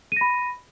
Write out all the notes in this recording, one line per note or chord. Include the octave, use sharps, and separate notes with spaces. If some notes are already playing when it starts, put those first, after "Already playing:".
B5 A#6 D#7